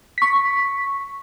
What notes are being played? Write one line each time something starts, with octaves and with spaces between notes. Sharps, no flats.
C#6 B6